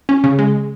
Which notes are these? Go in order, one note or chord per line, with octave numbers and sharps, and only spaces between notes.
C#4
C#3
G#3